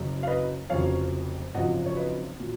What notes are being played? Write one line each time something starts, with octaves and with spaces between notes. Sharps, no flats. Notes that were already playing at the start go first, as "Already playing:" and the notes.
Already playing: F#1 F#2 C#3
F5
B4 D#5
F1 F2 C#3 F#3 C#5 F5
G#1 F#2 C#3 F3 D#5 F#5
C#5
B4 D#5
A#2 F#3